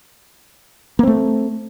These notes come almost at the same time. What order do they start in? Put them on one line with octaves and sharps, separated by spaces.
A#3 C4 A3